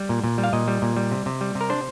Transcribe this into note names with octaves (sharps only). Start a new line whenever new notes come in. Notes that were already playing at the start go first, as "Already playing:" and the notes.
Already playing: G3
A#2
A#2
G3
F5
A#2 D#5
G3
A#2
G3
C3
C3
G3
C3
A#4
D4 C5